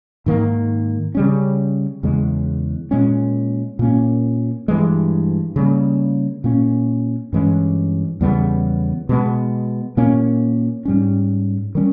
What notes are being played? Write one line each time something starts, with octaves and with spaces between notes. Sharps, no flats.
G#2 D#3 A#3
C#3 G3 C#4
E2 C#3 G#3
A#2 G#3 C#4
A#2 A#3 C#4
G2 E3 G#3
C#3 G3 A#3
A#2 A#3 C#4
G2 E3 G#3 C#4
E2 C#3 G3 B3
B2 G#3 B3
A#2 A#3 C#4
G#2 G3 C#4
D#3 G3 C#4